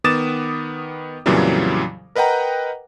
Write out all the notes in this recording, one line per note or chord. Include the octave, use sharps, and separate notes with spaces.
D#3 B3 D6 D#6 A6 E7
F2 A#2 C#3 E3 F#3 G3
A#4 B4 D#5 F#5 G5 A#5